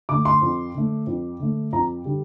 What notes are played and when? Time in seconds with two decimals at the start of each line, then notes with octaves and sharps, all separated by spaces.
0.09 D3 A3 D6
0.25 C6
0.42 F2
0.75 D3 A3
1.07 F2
1.40 D3 A3
1.73 F2 A#5
2.05 D3 G3